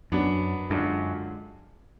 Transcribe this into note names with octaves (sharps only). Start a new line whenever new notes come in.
F#2 F#3 B3 D4
F#2 D3 G#3 D4 F4